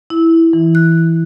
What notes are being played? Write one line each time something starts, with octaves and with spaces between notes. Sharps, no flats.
E4
E3
F#6